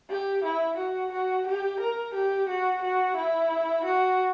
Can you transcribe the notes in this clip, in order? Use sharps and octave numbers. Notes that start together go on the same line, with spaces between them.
G4
E4
F#4
F#4
G4
A#4
G4
F#4
F#4
E4
F#4